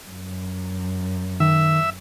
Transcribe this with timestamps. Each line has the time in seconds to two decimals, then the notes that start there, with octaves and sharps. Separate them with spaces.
0.10 F#2
1.40 D#3 E5